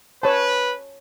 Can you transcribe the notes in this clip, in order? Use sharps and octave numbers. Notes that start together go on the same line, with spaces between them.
B4 C#5 A5